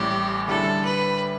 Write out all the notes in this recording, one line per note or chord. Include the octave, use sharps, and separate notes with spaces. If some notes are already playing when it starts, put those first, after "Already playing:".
Already playing: A1 A2 G3 G4
D3 G3 E4 A4
B4